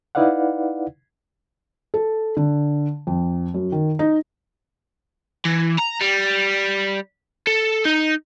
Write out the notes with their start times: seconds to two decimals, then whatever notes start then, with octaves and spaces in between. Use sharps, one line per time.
0.15 D#4 E4 B4 D5 F5 F#5
1.94 A4
2.37 D3
3.07 F2
3.54 F#2
3.72 D#3
3.99 D#4
5.45 E3
5.79 A#5
6.02 G3
7.47 A4
7.85 D#4